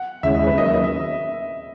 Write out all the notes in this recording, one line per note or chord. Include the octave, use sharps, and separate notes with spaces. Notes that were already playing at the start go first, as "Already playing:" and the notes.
Already playing: F#5
D#2 C#3 G#3 C#4 E4 E5
D#5
B4
D#3 F#3 A#3 C#4 D#5
E5
D#5
E5